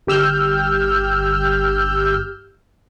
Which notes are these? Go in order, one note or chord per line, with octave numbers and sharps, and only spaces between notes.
G1 G4 E6 F6 G6